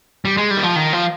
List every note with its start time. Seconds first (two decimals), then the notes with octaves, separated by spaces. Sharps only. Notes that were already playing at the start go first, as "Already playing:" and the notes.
0.25 G3
0.37 G#3
0.51 G3
0.57 D#3
0.63 F3
0.76 D#3
0.93 F3